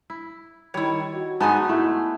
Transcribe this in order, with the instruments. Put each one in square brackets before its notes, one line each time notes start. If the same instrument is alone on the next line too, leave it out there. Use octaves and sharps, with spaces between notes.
[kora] E4
[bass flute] D#3 [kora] G3 [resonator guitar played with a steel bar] E4 C#5
[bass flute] F#4
[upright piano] G#2 [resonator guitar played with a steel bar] G#3 G#5 A5 [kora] B3 D#4
[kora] A3 [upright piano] E4